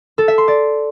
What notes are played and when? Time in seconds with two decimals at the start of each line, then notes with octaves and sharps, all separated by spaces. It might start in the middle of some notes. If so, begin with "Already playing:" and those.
0.18 A4
0.28 E5
0.38 C6
0.48 D5